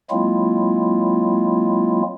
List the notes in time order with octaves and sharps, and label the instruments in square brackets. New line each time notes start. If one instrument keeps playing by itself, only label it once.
[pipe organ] F#3 G#3 A#3 C4 E4 F4